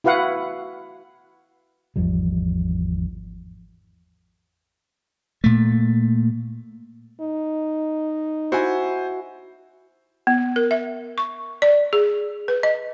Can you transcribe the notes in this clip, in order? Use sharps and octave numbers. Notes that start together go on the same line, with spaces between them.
E4 F#4 B4 F5 F#5
G#1 E2 F3 G3
A#2 A3
D#4
E4 F#4 C5 G#5
B3
A#4
E5
C#6
D5
G#4
B4
D#5